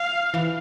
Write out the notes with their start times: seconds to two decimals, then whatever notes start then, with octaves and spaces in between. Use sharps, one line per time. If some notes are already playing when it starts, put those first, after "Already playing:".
Already playing: F5
0.34 E3